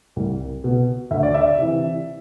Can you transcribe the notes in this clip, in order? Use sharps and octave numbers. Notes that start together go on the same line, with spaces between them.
C2
B2
D2 E5
D5
E5
C3 E3